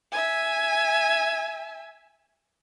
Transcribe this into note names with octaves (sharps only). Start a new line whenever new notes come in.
E5 G#5